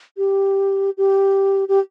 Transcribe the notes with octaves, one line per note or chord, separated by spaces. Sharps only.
G4
G4
G4